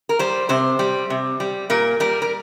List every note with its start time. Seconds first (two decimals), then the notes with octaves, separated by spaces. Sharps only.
0.09 A#4
0.19 G3 C5
0.49 C3 C5
0.79 G3
1.10 C3
1.40 G3
1.70 A#2 A#4
2.00 G3 A#4
2.22 A#4